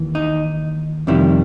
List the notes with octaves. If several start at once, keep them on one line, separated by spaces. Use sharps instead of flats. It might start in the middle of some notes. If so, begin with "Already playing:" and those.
Already playing: D#2 E3
D#4
F2 C3 D#3 G3 E4